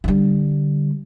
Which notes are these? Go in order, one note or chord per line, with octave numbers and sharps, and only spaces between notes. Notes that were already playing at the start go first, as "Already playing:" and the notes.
D3 G3